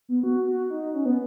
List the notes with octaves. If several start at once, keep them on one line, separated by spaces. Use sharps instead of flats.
B3
F#4
F#4
D#4
C#4
B3